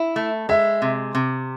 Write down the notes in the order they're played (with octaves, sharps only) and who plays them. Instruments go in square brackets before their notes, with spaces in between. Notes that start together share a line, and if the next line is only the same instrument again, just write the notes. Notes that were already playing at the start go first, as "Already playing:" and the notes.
Already playing: [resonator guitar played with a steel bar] E4
A3
[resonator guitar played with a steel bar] G#3 [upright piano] E5
[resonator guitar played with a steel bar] C3
C3